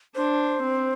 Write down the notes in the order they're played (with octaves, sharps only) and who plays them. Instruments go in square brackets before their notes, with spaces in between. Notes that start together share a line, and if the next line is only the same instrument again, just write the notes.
[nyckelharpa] D4 [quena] C5
[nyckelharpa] C4